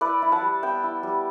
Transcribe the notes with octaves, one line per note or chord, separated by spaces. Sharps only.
E4 B4 D5
E4
F#5 A5
G3
B3 E5 G5
E4
G3